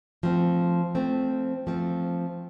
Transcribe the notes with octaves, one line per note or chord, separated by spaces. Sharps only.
F3 A3 C4
F3 A3 C4
F3 A3 C4